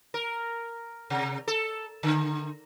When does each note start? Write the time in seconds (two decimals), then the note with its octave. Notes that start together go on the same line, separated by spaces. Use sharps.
0.14 A#4
1.10 C3
1.48 A4
2.03 D3